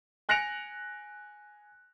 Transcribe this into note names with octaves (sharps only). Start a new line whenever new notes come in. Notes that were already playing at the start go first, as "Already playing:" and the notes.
G#5 F#6 A#6 C#7 D7 F7